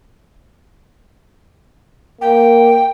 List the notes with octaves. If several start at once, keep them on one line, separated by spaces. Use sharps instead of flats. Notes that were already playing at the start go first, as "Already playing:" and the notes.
A#3 G5